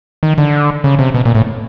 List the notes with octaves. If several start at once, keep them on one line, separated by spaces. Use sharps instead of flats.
D#3
D3
C#3
C3
B2
A#2
A2